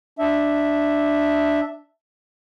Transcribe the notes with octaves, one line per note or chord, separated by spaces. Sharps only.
D4 E5